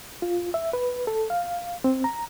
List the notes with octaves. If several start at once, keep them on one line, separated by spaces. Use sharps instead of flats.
F4
E5
B4
A4
F5
C4
A#5